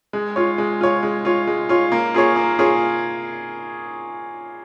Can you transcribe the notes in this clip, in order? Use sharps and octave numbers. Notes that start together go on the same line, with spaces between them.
G#3
F4 C#5
G#3
F4 C#5
G#3
F4 C#5
G#3
F4 C#5
A#3
F4 G#4 C#5
A#3
F4 G#4 C#5